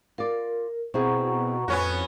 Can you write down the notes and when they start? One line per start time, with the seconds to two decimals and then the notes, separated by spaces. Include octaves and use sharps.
0.18 F4 A#4 D5
0.94 B2 C4 E4 G#4 F#5 A#5 C#6
1.68 F2 A2 B3 C#4 F#4